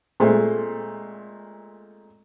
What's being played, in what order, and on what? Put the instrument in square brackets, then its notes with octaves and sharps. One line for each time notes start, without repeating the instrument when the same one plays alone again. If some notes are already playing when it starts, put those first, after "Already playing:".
[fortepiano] A#2 G#3 A3 C4